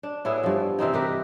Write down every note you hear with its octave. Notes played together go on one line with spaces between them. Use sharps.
D4
A2 B3 E4 G#4
G2 F3
C3 E3 C4 D#4
G4 A#4 B4